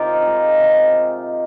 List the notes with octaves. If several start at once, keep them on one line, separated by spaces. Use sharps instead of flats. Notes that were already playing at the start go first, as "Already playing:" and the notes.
Already playing: C3 D#4 F4 G4 A#4
D#3 G#3
C3